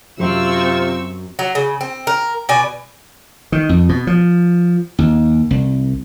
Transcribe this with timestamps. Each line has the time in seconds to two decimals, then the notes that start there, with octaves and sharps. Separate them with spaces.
0.20 F#2 C3 C4 F4 C#6 E6
1.39 F#3
1.55 C#3
1.81 C4
2.07 A#4
2.49 B2 D5 G#5
3.52 D#3
3.69 F2
3.89 B2
4.07 F3
4.99 D#2
5.51 C2